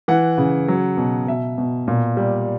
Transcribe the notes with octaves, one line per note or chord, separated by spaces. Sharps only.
E3 F#5
C#3
F#3
B2
B2 E5
B2
A#2
G3